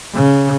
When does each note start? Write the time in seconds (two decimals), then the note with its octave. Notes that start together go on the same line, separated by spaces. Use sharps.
0.14 C#3